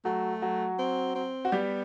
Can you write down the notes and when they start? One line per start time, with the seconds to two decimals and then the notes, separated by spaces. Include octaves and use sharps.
0.05 F#3 A3 F#4
0.42 F#3 F#4
0.79 C4
1.15 C4
1.45 F#4
1.52 G3 B3 G4